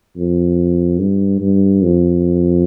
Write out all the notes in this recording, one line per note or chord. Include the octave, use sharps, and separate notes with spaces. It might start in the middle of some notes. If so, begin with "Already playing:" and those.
F2
G2
G2
F2